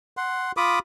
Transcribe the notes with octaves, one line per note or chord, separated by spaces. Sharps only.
F#5 C6
F4 B5 D6 D#6